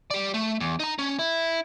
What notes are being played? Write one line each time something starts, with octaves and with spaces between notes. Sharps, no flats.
G4 D5
A3
E2
D#4 A#5
C#4
E4